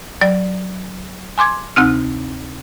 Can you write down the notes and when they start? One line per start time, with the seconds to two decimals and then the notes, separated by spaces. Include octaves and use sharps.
0.21 F#3 D5
1.38 G#5 C6 D6 G#6
1.76 D2 C3 C4 D#4 F6